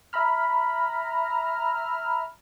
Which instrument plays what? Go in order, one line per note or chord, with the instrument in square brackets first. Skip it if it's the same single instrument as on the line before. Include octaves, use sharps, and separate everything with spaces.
[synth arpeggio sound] E5 A#5 B5 F6